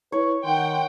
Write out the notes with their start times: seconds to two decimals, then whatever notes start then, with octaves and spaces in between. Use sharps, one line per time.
0.12 E4 B4 C#5
0.44 D#3 F#5 G5 C6